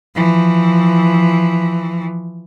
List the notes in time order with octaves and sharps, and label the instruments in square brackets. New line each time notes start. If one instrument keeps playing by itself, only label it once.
[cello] E3 F3